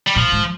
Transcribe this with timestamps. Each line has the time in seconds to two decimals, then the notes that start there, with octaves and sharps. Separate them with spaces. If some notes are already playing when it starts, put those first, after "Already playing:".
0.07 G3
0.15 A#2 F3
0.32 G#2